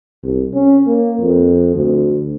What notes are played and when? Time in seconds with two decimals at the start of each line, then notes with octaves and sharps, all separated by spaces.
0.23 C2
0.54 C#4
0.87 A#3
1.21 F2
1.75 D2